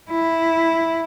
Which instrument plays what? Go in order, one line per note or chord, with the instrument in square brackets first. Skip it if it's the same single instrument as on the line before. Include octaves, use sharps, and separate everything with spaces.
[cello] E4